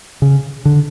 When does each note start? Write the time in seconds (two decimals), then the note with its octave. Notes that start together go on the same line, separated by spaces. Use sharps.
0.22 C#3
0.65 D3